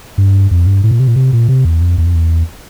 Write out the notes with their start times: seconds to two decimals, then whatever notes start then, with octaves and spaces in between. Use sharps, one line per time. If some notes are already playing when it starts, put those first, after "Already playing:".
0.18 G2
0.51 F2
0.67 G2
0.83 A2
0.91 A#2
1.00 C3
1.08 A#2
1.16 C3
1.33 A#2
1.48 C3
1.65 E2
1.81 F2
1.98 E2
2.06 F2
2.14 E2